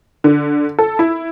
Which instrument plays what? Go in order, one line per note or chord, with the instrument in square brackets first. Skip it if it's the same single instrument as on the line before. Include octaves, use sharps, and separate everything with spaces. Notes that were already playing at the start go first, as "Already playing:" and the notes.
[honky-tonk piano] D3
A4
E4